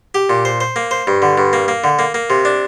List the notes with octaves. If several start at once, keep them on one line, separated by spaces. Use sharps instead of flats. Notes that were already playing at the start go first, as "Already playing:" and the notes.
G4
A#2
C5
C5
A#3
C5
G2
D3
G2
A#3
A#3
D3
A#3
A#3
C3
D4